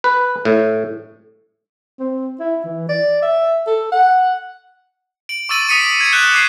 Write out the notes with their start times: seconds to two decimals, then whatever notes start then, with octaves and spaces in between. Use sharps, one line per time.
0.04 B4
0.45 A2
1.99 C4
2.40 E4
2.65 E3
2.89 D5
3.22 E5
3.67 A4
3.92 F#5
5.29 D7 F#7
5.49 C#6 D6 E6 A6 D#7 F#7
5.69 D6 D#6 B6 C#7 D#7
6.00 G#6 C#7
6.12 F#6 G6 E7 G7
6.34 D6 C7